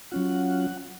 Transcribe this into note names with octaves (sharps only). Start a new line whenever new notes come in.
F#3 C#4 F4 F#5